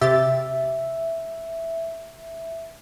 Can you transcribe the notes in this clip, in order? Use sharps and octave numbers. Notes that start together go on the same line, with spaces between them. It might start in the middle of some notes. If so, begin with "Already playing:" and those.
C3 G4 E5 A6